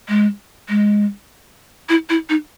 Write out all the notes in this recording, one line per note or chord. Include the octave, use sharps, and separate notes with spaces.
G#3
G#3
E4
E4
D#4